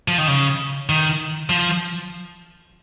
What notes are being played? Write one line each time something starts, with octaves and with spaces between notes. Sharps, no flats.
F3
D#3
C#3
D#3
F3